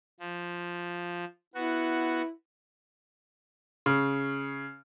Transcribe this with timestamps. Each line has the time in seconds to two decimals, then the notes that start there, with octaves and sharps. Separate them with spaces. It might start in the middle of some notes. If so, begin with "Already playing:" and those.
0.20 F3
1.54 B3 E4 F#4
3.86 C#3